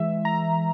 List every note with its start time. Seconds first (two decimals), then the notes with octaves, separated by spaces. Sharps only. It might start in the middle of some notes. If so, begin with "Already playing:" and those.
Already playing: E3 G#3 E5
0.25 A#5